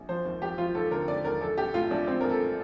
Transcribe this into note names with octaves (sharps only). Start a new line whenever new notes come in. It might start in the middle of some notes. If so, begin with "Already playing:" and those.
Already playing: A#1
F3 C5
D#2
F3 G4
F3 F4
D#2 A4
D3 A#4
D#2 D5
D#2 A#4
A#1 A4
A#1 G4
A2 F4
A#1 D4
A#1 C4
A#1 A#4
A4